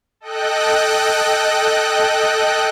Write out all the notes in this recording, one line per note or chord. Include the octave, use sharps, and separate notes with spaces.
A4 D#5 G5 F#6